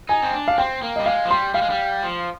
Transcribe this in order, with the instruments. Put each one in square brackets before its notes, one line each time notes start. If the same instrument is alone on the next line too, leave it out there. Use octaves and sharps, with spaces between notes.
[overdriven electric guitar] D#4 [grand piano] G#5
[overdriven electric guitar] C4
D4
[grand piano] F5
[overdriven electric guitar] C4 [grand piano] G5
[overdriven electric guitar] A#3
[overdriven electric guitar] G3 [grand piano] D#5
[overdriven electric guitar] G#3 [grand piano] F5
[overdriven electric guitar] F3
[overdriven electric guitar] G3 [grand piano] C6
[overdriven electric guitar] G3 [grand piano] F5
[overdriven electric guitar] G#3
G3
F3